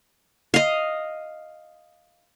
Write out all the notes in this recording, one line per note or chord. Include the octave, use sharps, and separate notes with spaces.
D#5 F5